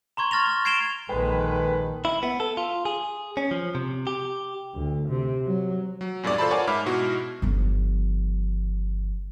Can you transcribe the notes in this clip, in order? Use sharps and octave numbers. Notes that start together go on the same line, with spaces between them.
A#5 C6 C#6 G#6
C#6 F6 A6 A#6 F7
C#6
G#6 C7 D7 E7 F7 G7
A#1 D#3 G#3 A4 B4 G5
E4
B3
A4
F4
G#4
C#4
F3
C3
G4
D2
C3
F#3
F#3
E2 G2 A#2 G#4 D5
F4 A4 C5 D5 A5 B5
A#4 C#5 D5 F#5 G#5
G#2 B4 E5 B5 D6 F6
G#2 B2 E4 F#4
G1 F3